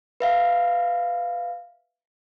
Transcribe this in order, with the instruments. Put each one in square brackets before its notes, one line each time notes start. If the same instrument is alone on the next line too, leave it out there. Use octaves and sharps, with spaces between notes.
[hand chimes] B4 E5 F5